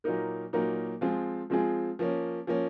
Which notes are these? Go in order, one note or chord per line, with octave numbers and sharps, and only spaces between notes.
A#2 F#3 A#3 D#4 A#4
A#2 F#3 A#3 D#4 A#4
F3 G#3 C4 F4 G#4
F3 G#3 C4 F4 G#4
F3 A#3 C#4
F3 A#3 C#4